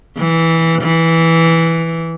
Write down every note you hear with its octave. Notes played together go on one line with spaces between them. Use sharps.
E3
E3